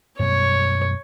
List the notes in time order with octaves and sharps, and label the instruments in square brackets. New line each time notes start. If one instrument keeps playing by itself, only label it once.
[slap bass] F#2 B2 G3 [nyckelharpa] C#5